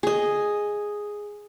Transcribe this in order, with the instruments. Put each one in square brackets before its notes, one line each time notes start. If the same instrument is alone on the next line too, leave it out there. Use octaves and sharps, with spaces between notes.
[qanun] G#4 D#5